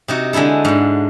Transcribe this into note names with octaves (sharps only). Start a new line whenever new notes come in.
C3 D#4 F#4
D3 G#3 D#4 E4 A4
G#2 D3